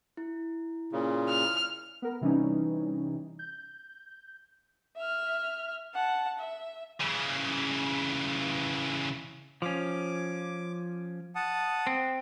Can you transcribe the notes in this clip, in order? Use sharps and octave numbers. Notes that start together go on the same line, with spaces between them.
E4
A#2 C#3
F6
B3 A#4
C3 E3 G3 C#4 D#4
G6
E5 F6
F#5 A5
E5
C#3 E3
F3 C#4 D6
F#5 A5 D#6
C4